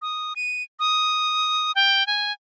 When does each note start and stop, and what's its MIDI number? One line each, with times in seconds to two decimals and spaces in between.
0.02 0.33 87
0.36 0.63 99
0.79 1.72 87
1.75 2.06 79
2.07 2.32 80